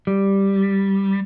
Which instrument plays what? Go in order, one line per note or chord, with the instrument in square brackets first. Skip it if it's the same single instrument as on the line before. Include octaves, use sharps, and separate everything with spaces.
[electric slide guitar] G3